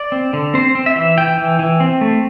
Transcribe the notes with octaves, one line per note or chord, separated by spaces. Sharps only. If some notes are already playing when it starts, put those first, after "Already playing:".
Already playing: D5
C4
D3
C4 C5
C4
E5
E3
E3 G5
E3
E3
C4
A3